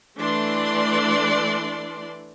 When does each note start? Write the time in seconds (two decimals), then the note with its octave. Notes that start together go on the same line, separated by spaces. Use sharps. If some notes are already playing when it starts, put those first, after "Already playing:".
0.19 E3 A3 D4 D5 C6